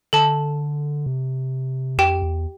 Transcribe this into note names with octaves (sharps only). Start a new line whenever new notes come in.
D3 A4 A5
C3
F2 G4 G5
E2